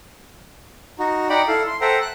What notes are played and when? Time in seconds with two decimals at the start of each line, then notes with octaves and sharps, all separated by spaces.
0.99 D#4 F#4
1.30 D#4 D5 F#5 G5 B5
1.48 E4 A4 F5
1.67 C6
1.81 A4 C5 E5 F#5 G5 A#5
2.02 F#6